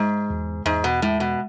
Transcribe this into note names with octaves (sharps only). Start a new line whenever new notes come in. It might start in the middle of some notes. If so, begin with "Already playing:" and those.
Already playing: G#2 G#3
E2
E2 G#2
B2
A2 G#3
B2